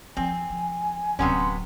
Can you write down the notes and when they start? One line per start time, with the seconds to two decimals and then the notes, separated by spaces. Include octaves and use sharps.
0.17 F2 F3 C4 G#5
0.50 F3
1.19 D1 C3 F#3 B3 C#4 C6